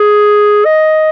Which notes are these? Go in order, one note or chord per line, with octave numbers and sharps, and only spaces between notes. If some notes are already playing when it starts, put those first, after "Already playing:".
Already playing: G#4
D#5